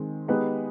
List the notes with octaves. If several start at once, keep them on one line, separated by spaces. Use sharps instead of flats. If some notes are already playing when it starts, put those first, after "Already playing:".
Already playing: D#3 G#3 C4
G#3 B3 D#4 G4 B4